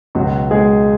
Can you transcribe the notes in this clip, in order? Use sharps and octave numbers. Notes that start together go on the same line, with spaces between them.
C#2 B2 F#3 F#4
G#3 G#4